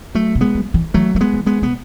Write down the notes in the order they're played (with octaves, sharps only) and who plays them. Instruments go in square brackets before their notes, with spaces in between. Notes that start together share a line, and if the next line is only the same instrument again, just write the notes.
[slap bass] F#3 A3
[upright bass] B2
[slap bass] G#3 B3
[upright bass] F#3
E3
[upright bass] E3 [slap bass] F#3 A3
[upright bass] F#3 [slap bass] A3
[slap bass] G#3 B3
[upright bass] E3
[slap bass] G#3 B3
[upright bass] B2 [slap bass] B3